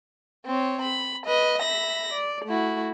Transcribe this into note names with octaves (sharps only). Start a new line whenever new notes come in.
C4 C#5
B5
B4 D#5
E5 B5 A#6
D5
A3 E4 F#4